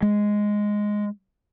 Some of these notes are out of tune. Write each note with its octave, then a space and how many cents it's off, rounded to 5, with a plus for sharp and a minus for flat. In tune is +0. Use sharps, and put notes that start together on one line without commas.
G#3 +0